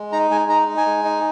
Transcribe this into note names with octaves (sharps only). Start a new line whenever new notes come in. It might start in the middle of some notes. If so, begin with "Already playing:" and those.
Already playing: G#3
D#4 A#5
G#3 G#5
D#4 A#5
D#4
G#5
G#3
D#4